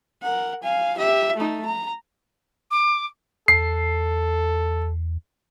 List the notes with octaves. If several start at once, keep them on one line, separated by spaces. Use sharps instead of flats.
A#4 F#5
F5 G#5
G4 E5
A3 D#4
A#5
D6
E2 A4 C7